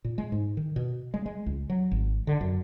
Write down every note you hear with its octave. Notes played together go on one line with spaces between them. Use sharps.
A#2
G#3
G#2
D#3
B2
G#3
G#3
C#2
F#3
G#1
D3
F#2